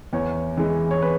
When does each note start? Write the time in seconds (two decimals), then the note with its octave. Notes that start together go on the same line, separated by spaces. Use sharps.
0.13 E2 C#5
0.58 E3 G#3
0.91 C#5
1.02 B4